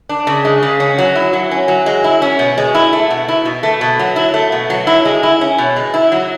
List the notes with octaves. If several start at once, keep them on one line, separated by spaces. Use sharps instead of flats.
D4
C#3
G#3
C#3
C#4
F#3
E4
F#3
C#4
F#3
G#3
E4
C#4
B2
G#3
E4
A3
B2
E4
B2
A3
B2
F#3
E4
A3
B2
F#3
E4
G#3
E4
C#4
B2
G#3
E4
F#3